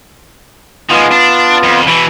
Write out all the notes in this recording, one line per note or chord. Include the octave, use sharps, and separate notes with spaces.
D#3 G#3 B3 F4
D4
F2
B2 E3 B5